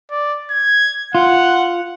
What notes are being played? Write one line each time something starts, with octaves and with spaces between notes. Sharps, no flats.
D5
G#6
F4 F#5